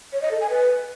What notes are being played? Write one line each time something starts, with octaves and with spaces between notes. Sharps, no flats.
C#5
D#5
A4
G#5
B4